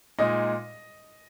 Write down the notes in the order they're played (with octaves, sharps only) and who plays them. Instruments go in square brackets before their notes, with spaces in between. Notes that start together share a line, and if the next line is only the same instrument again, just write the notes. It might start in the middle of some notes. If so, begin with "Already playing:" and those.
[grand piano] A#2 G#3 D#4 [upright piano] D#5